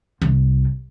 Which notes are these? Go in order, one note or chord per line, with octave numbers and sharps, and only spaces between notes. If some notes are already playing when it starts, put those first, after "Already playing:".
C2